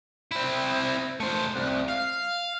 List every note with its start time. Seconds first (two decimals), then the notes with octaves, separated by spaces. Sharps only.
0.32 C4 E4
1.20 A3 C5
1.56 C2
1.88 F5